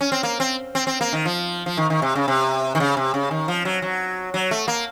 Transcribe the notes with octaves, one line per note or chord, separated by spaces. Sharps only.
C#4
C4
A#3
C4
C4
C4
A#3
D#3
F3
F3
D#3
D#3
C3
C#3
C3
D#3
C#3
C3
C#3
D#3
F3
F#3
F#3
F#3
A3
A#3